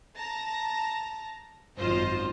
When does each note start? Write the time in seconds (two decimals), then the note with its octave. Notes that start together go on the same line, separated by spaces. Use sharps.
0.16 A5 A#5 A#6
1.77 G#1 F#2 F4 C5 D#5